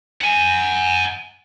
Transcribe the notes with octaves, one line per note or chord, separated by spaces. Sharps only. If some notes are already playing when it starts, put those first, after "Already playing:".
F#5 G#5